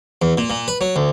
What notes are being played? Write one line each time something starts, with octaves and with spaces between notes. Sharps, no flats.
E2
A#2
A#2
B4
F#3
D2